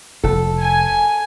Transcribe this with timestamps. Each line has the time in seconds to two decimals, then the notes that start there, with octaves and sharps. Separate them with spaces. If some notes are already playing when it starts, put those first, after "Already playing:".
0.24 F1 A4
0.62 G#5